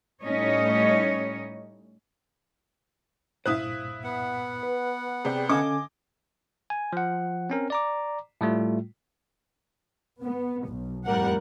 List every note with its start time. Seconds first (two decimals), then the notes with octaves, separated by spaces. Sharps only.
0.22 A2 G3 C#4 D#4 C#5 D#5
3.46 C2 G2 A#2 E4 C5 F5 D#6 F#6
4.04 B3 F#5
4.63 B4
5.25 C3 G#4 D5 G5
5.49 D3 C#4 A4 D#5 F5 G#5 D6 G#6
6.70 G#5
6.93 F3 F#5
7.50 C4 C#4 A#4
7.70 D5 A#5 D6
8.41 A2 G3 A3 F4
10.21 B3
10.66 B1
11.05 F2 A2 G3 A#4 F#5